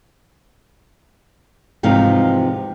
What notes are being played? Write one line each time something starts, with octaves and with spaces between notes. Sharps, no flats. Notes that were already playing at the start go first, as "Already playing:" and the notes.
E2 G#2 C3 F3 D#4 F5